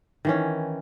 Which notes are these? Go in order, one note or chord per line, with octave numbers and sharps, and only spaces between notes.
D#3 E3 C#4